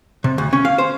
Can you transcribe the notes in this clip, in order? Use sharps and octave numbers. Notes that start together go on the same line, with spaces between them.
C3
D2
C#4
F5
C5